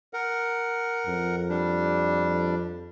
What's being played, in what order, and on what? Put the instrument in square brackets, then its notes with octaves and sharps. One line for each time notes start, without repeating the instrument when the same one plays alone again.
[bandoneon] A#4 F#5
[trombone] F2
[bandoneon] G3 D4